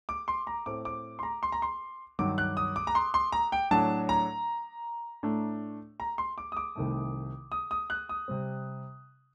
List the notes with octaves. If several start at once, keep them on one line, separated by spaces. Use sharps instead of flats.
D6
C6
A#5
A2 A3 C4 D6
D6
C6
A#5
C6
A#5
C6
G2 D#3 F#3 D6
F#6
D#6
D6
A#5
C6
C6
A#5
G5
A2 F#3 A3 D4 A5
A#5
A2 A3 D4
A#5
C6
D6
D#6
D6
C2 C3 D#3 A3
D#6
D#6
F#6
D#6
C3 G3 C4